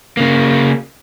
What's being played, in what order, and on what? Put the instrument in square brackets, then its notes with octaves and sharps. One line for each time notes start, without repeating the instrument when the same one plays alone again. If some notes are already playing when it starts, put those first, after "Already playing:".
[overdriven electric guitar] C#3 A#3